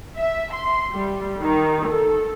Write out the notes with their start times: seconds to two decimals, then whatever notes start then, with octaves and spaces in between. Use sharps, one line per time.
0.17 E5
0.53 C6
0.93 G3
1.41 D#3
1.89 A4